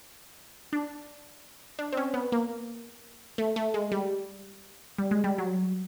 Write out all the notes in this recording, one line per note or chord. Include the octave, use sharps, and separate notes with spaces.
D4
D4
C4
C#4
B3
A#3
A3
A3
G#3
G3
G3
G#3
G3
F#3